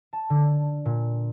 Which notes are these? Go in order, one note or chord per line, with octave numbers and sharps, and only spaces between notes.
A5
D3
A#2